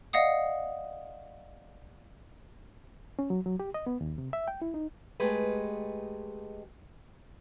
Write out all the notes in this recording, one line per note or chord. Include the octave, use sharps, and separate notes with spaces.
D5 D#5 F5 F#5 D#6
C#4
F#3
F#3
G4
D#5
B3
D#2
C3
E5
G5
E4
D#4
G#3 A3 G4 G#4 B4